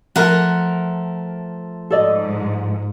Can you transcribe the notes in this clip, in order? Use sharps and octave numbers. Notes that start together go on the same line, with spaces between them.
F3 A3 A#4 F#5
G#2 A4 D5 D#5